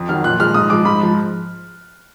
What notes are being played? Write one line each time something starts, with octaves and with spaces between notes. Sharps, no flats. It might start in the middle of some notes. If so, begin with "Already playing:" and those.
Already playing: F2
D#3 F#3 F6
A#2 F#6
F3 G#3 F6
G#2 D#6
F3 G#3 D6
G#2 B5
F3 G#3